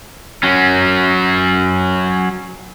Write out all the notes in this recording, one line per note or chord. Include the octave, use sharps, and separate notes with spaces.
F#3 C#4